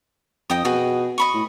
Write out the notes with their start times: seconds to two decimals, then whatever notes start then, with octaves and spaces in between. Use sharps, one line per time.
0.50 F2 D#5 G5 D#6
0.65 B2 F#4 G#4
1.18 D#5 B5 C#6
1.34 A2